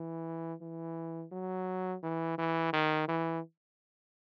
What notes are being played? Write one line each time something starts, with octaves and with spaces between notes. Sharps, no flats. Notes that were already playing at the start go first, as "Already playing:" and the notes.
Already playing: E3
E3
F#3
E3
E3
D#3
E3